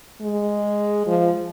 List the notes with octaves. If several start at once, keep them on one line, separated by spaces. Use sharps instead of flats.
G#3
F3